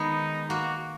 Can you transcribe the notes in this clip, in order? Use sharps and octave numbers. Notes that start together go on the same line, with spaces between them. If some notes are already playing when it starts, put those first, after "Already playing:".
Already playing: D#3 G#3 B3 D#4
A#3 F#4